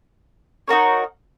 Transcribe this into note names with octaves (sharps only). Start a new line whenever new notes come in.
D#4 F#4 A#4 C#5